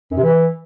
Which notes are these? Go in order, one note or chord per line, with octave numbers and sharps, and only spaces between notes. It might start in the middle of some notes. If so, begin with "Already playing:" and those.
F#2
C3
E3